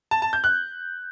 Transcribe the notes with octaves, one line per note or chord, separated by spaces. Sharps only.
A5
A5
G6
F#6